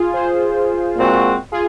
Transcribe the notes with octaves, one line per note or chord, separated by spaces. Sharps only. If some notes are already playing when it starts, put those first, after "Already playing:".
Already playing: F4 G#4
G#4 C5
A#2 G#3 C4 F#4
F4 G#4